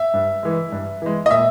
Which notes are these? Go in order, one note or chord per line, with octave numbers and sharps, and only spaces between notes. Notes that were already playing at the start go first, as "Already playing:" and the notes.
Already playing: E5
G2
E3 G#3
G2
E3 G#3
D#5
A#2 E5